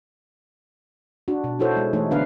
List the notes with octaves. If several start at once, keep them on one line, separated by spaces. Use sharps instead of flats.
D4 F#4
B2
D#4 E4 F#4 A4 C5 C#5
G#3
E3 A3 D#4 C#5
D3 B3 D4 B4 F5